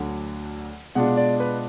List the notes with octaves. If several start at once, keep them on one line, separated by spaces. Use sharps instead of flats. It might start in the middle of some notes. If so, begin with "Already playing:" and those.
Already playing: D2 D3 F#3 D4
B2 G#3 D4 F4 F#5
D5
B4